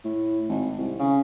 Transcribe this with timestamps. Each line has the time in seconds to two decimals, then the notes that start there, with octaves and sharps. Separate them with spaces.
0.04 A2
0.48 G#1
0.78 C2
0.99 C#3